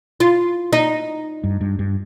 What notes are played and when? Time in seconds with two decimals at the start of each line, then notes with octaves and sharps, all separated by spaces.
0.20 F4
0.73 D#4
1.44 G2
1.61 G2
1.79 G2